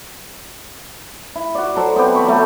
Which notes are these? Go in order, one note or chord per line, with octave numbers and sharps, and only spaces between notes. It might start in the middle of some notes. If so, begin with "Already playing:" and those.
E4
F#4 D5
F#3 A4 C5
B3 C4 G4
E3 B5 C#6
F#3 A3